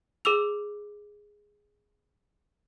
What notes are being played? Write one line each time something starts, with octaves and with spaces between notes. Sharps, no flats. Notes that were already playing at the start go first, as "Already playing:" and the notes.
G#4 D6 E6 F7